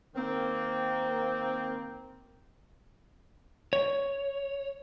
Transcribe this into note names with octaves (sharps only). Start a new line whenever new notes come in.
D#3 A#3 C4
C#5